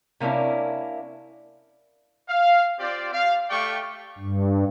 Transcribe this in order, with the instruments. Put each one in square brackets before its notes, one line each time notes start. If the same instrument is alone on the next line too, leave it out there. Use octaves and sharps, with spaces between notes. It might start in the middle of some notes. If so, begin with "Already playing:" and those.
[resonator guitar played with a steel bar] C3 A#3 C#4 D4 E4
[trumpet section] F5
C4 F4 G4 C5 D5
F5
A3 G4 D5 F5 G5 C#6
[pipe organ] G2